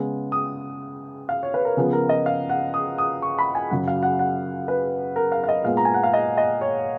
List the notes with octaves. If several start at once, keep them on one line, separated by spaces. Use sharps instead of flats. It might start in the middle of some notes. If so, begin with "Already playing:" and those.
Already playing: C#3 G#3 B3
D#6
F5
C#5
B4
A#4
C#3 F3 B3 G#4
A#4
D#5
F5
F#5
D#6
D#6
C#6
B5
G#5
F#2 C#3 F#3 F#5
F5
F#5
F#5
B4
A#4
F5
F5
D#5
A#2 G#3 B3 F5
A#5
G#5
F#5
F5
D#5
D#5
C#5